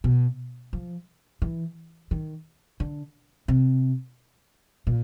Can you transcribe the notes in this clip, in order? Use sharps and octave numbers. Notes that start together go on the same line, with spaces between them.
B2
F3
E3
D#3
D3
C3
A#2